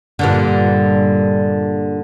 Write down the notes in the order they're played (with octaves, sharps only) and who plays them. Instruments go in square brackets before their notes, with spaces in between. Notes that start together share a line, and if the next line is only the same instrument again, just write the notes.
[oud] G2 A#2 D3